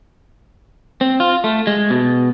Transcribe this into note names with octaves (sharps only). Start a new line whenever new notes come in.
C4
F4
A3
G#3
B2